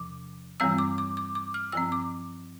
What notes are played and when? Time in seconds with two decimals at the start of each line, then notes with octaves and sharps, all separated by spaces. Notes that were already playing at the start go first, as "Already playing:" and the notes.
Already playing: E2 C3 F3 D6
0.60 G2 E3 G3 C4 E6
0.78 D6
0.98 D6
1.17 D6
1.35 D6
1.54 F6
1.72 G2 F3 C4 E6
1.92 D6